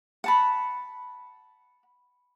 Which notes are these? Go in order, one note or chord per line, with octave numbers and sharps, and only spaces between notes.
F#5 A5 B5